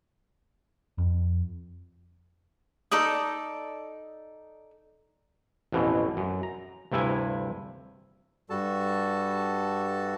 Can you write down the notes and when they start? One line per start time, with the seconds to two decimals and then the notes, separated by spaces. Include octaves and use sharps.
0.98 F2
2.91 D#4 A4 D5 D#6
5.72 A1 F2 B2 E3
6.17 F#2
6.43 A#5
6.92 D2 G2 C3 E4 G#5
8.50 G2 G3 F#4 A4 A5